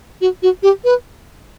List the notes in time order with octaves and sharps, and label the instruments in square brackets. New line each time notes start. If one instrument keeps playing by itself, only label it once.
[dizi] F#4
F#4
G4
B4